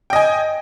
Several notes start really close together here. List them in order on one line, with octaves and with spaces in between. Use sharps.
G5 D#5 G#5